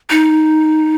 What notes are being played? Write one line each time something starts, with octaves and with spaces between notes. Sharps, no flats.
D#4